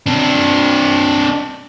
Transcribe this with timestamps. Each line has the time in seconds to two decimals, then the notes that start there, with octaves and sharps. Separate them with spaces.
0.06 C4 D4